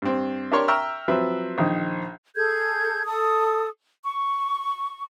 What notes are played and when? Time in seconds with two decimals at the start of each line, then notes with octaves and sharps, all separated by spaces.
0.02 G2 C4
0.52 D4 G4 A#4 C#5 C6 C#6
0.68 E5 G5 A#5 C#6 E6 F6
1.08 F3 F#3 C4 B4 E5
1.58 A#1 D#3 D#4
2.35 G#4 A4 G6 G#6
3.05 A4 D#6
4.04 C#6